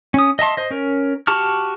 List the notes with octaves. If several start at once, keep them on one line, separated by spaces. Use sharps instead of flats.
C#4 D#6
D#5 E5 A5 C6
C5 D#5
C#4 A#4
F#4 G4 A5 C#6 F6